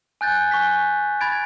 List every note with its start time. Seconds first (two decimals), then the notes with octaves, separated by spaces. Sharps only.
0.21 G#5 F#6 G6 A6
0.51 G#5 C#6 F#6 B6
1.21 B5 G#6 A6 D7